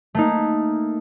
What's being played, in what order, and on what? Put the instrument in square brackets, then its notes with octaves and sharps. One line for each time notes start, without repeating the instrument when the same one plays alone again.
[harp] A3 A#3 D#4